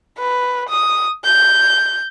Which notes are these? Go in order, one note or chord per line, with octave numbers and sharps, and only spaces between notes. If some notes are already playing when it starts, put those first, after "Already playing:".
B4
D#6
G6